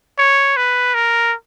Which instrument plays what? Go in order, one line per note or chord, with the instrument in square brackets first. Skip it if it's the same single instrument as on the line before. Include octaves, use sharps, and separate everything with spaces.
[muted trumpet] C#5
B4
A#4